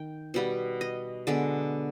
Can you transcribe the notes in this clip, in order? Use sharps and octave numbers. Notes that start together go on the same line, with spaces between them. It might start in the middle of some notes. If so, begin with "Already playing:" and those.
Already playing: D#3 G5
B2 G3 B3
D#5
D3 G#3 B3 D5